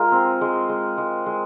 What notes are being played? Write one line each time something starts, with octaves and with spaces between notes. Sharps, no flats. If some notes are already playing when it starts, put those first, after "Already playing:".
Already playing: G#3 F4 A#4
C4
G#3
G#3
G#3
G#3